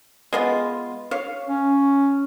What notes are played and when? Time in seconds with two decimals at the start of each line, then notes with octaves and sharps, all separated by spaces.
0.33 G#3 B3 F4
1.11 C#5 F5
1.47 C#4